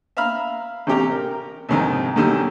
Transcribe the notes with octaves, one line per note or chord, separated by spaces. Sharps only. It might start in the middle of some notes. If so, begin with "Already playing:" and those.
E5 F5 A#5 B5 F6
A1 C3 G4 A#5
A#4
C2 F2 G#2 D#3
F#2 B2 D3 D#3 G3